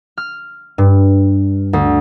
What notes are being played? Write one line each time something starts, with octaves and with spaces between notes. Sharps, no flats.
F6
G2
D2